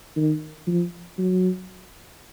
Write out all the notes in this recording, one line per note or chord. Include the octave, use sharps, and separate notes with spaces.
D#3
F3
F#3